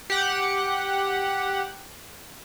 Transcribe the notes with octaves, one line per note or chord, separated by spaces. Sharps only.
G4 F#5 F#6